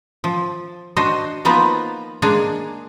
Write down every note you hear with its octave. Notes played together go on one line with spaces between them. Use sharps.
F3
D4 F#4 C5 D#5
F3 A#3 B3 D#4 F4 B4
G#3 A#3 D4 G#4